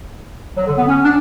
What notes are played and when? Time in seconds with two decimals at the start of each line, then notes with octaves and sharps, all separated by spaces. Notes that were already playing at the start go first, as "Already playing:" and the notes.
0.57 F#3
0.67 D3
0.78 B3
0.87 C#4
1.04 D4